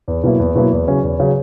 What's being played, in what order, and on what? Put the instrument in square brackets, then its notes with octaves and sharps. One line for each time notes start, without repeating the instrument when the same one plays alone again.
[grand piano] E2
B2 F#3 A#3 E4
E2
B2 F#3 A#3 E4
E2
C#3 F#3 C#4
E2
C#3 F#3 C#4